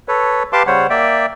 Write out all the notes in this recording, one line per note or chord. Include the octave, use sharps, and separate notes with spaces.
A4 B4 C#5
G4 B4 F5 A5 C6 D6
C#3 G3 C5 C#5 F#5
A#3 D5 E5 G5